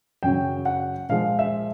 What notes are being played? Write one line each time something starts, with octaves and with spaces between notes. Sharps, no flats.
F#2 C#3 F#3 G5
F#5
A#2 F3 G#3 F5
E5